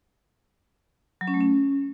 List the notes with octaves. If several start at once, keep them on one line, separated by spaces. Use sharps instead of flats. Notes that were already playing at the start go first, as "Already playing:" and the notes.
F#3
C#4
A3
C#4